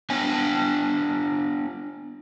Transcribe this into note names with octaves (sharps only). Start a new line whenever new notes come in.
B3 D4 G#5